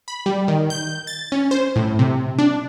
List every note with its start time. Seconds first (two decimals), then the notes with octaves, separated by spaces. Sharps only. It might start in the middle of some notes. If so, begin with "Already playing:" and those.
0.08 B5
0.26 G3
0.48 D#3
0.70 G6
1.07 A6
1.32 C#4
1.51 C5
1.76 A2
1.99 C3
2.38 D4